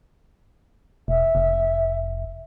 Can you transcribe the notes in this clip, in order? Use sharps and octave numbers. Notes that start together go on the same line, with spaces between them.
E1 E5
F1